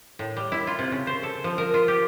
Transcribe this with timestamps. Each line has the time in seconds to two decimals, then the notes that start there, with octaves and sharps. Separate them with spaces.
0.19 A2
0.37 G3
0.52 E4
0.67 F4
0.79 C3
0.92 C#3
1.07 C5
1.23 A4
1.44 F3
1.58 A#4
1.74 F4
1.88 G4